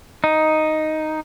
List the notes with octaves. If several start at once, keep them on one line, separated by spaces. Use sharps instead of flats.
D#4